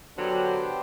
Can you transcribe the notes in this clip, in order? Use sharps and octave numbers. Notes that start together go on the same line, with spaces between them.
D3 F#3 B3 D4 G4 C5 G5